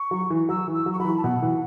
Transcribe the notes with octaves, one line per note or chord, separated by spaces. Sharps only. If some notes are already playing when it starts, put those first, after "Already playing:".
Already playing: C#6
F#3
E3
F#3 E6
E3
E6
F#3
C#6
F#3 B5
E3
A5
B2 F#5
E3